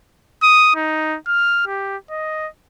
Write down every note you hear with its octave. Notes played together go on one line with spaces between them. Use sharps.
D#6
D#4
F6
G4
D#5